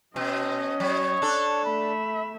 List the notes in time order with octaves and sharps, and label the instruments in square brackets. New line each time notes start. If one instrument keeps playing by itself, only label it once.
[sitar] B2 [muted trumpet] C4 [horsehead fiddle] C#4 D#5
[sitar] F#3 [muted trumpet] C#5
[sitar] D4 A4
[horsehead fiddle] A3 E5 [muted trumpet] B5